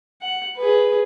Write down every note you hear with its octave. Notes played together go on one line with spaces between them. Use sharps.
F#5
G#4 B4